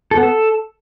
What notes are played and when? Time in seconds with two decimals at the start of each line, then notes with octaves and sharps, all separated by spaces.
0.11 A4
0.17 B3
0.23 A4